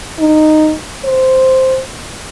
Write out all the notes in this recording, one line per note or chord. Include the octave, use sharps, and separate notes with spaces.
D#4
C5